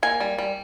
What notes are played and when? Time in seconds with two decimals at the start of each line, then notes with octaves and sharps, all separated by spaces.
0.03 A#3 G#5
0.20 G3
0.38 G3